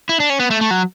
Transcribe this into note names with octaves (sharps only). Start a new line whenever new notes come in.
E4
D4
C#4
B3
A3
A3
F#3